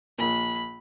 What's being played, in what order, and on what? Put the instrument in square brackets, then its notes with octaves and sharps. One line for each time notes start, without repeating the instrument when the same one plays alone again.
[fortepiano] A#1 A#2 [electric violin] B5